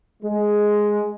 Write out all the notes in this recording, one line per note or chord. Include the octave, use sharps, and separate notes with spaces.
G#3